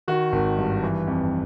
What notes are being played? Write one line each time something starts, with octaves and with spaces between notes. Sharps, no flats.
D#3 F#4
G#1
G2
E3
F2